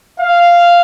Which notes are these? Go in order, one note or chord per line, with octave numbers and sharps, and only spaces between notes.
F5